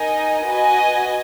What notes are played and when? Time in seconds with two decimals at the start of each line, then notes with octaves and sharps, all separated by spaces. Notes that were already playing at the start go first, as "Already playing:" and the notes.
Already playing: D#4 A#4 D#5 G#5
0.48 F#4 B4 D#5 G#5